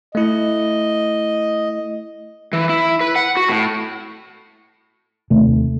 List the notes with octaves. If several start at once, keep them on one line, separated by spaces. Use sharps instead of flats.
A3 E4 D#5
E3
E4
B4
F#5
F#4
A2
D#2 C3 A3